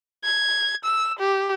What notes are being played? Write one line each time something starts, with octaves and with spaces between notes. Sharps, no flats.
G#6
E6
G4